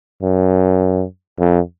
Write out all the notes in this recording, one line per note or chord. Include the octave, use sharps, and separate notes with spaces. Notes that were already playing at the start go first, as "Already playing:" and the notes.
F#2
F2